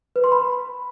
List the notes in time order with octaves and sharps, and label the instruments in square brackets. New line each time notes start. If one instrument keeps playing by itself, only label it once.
[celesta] B4
C6
B5